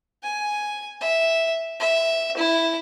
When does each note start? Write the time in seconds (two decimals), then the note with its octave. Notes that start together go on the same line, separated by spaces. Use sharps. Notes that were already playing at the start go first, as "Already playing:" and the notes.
0.24 G#5
1.01 E5
1.80 E5
2.37 E4